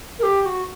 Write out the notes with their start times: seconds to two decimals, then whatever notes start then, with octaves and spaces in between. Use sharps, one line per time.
0.19 A#4
0.23 G4
0.42 G4
0.46 F#4